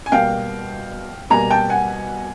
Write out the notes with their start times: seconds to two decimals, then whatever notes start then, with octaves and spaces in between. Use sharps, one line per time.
0.06 G#5
0.12 B2 G3 A#3 F5 G5
1.30 B2 G3 A#3 G#5 A#5
1.50 G5 A5
1.70 F#5 G#5